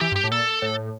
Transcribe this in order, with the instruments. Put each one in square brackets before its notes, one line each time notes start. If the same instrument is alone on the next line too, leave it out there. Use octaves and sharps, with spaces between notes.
[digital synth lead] E3 [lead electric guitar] G4
[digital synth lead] G2
[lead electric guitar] G4
[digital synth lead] A2
[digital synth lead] A#2 [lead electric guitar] A4
[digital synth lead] A2